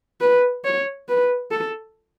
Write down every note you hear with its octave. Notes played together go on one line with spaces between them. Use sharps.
B4
C#5
B4
A4